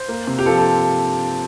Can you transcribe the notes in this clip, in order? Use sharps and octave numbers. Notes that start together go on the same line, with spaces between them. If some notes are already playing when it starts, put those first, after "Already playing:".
Already playing: C5
A#3
C3
G4
F3 A4
A4